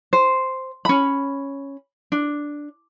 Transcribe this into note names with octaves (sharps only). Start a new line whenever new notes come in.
C5
C#4 B5
D4